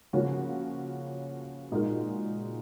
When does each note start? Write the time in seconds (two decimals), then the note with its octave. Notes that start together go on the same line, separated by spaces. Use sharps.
0.13 C#3 F3 A#3 C#4 F#4
1.71 A#2 G#3 D#4 F#4 A#4